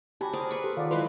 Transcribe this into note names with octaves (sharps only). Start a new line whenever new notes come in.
F#4 G4 G#5 A5 B5
G#4 A#4 C5 D5
B4 C#6
G4 A4 C6
D#3 F4 A4 D5 F5 F#5
E3 F#3 G#3 B4 C6